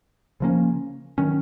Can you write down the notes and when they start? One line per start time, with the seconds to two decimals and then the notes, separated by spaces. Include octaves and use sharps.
0.40 C#3 F3 A#3 C#4
1.18 D#3 F#3 C#4